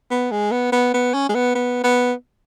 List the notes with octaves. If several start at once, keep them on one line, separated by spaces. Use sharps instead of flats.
B3
G#3
B3
B3
B3
C#4
G#3
B3
B3
B3